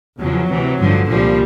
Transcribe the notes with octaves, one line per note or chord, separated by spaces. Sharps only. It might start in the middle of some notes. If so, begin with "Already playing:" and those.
E2 C#3 F3 F#3
D2 C3 E3
A1 G2 D3 F3
C2 A#2 F3 G3